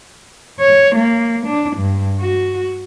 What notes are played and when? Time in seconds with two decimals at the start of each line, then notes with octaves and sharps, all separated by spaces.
0.60 C#5
0.96 A#3
1.47 D4
1.77 G2
2.21 F#4